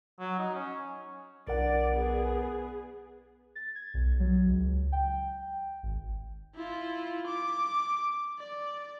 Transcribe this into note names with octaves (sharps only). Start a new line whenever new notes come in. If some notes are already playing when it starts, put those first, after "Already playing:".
F#3
D#4
C#4
B1 D4 A#4 D5 F#5
B3 G#4
A6
G#6
B1
F#3
C#2
G5
G#1
E4 F4
D6
D5